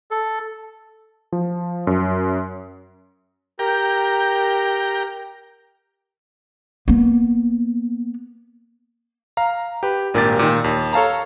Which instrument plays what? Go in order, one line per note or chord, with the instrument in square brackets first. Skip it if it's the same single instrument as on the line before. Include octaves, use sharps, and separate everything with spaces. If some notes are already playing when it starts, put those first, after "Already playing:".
[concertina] A4
[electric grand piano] F3
F#2
[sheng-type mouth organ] G4 A#4 G6 [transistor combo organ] G5 A#5
[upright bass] A#3 B3
[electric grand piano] F5 A#5
G4 B4
G#1 A#2 A#3 D4 G4 A6
A#2 D#3
D#2
A4 C#5 F5 A5 A#5